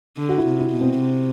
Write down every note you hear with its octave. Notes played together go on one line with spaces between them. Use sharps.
D3
F#4
E4
C3
E4
B2
C4
C3